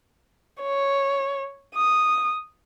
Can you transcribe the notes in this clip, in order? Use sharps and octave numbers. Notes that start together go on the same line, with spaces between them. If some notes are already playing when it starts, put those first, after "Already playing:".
C#5
D#6